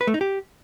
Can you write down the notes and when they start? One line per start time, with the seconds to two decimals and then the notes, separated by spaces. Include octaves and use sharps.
0.01 B4
0.07 A3
0.14 D#4
0.21 G4